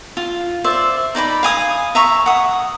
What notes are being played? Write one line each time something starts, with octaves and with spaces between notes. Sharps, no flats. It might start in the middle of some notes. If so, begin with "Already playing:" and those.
F4
C5 D5 E5
D#4 D5 G#5 B5
F5 G#5 D#6
E5 A#5 C#6
F#5 D#6